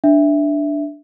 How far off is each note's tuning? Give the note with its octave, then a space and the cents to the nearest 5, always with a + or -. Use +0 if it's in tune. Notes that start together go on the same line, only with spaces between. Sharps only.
D4 +0 E5 +0